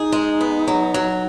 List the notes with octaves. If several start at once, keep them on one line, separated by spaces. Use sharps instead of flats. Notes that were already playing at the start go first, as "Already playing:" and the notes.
Already playing: D#4 G#4
G#3
B3
F#3
F#3